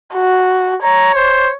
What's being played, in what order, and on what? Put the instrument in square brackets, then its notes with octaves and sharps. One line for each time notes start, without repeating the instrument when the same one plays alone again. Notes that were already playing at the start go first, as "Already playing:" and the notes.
[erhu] F#4
[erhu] C#5 [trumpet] A#5
[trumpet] C5